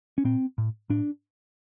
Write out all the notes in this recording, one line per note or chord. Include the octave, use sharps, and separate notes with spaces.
C#4
A#2 C4
A2
A2 D4